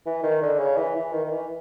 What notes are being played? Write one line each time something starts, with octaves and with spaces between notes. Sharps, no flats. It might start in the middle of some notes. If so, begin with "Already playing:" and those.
E3
D#3
D3
C#3
E3
E3
D#3
D#3
E3